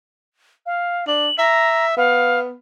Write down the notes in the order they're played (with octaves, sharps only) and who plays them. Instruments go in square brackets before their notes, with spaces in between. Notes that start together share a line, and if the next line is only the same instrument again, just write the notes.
[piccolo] F5
[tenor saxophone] D4 [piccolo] F#7
[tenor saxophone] E5 [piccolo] A#5
[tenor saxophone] B3 [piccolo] F5